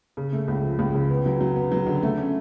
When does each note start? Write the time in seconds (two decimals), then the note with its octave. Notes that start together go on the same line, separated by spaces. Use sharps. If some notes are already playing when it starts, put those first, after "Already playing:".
0.17 C#3
0.32 A3
0.48 C#2
0.63 F3
0.79 C#2
0.94 C#3
1.10 B3
1.26 F#3
1.40 F#3
1.56 B3
1.71 F#3
1.87 D3
2.03 A3
2.17 C#4